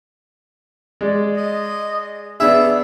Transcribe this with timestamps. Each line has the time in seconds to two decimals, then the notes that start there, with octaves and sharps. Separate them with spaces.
1.01 G#3 D5
1.37 D#5
2.40 B3 D4 G#4 E5